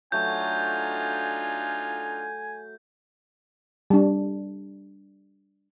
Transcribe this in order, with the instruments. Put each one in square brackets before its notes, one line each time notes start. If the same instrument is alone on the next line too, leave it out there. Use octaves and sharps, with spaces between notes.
[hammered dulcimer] F#3 A3 A4 [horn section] D4 D#4 F4 [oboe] G#5 [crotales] G6
[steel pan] G3 D4